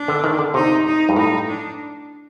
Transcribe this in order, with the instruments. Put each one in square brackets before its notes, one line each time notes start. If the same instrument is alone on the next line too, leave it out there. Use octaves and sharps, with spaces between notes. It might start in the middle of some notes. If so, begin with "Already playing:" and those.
Already playing: [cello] D4
[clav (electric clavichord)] D3
D#3
D3
[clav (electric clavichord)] C3 [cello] D#4
[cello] D#4
[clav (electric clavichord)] G2
[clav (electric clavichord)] A2 [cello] D#4
[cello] D4